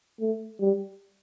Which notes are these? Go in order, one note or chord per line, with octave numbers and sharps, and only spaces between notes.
A3
G3